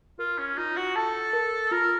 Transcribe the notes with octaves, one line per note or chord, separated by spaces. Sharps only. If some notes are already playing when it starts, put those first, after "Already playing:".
F4 A#4
C#4
D#4 F4
F#4
A4 A5
A#4
F4 A#4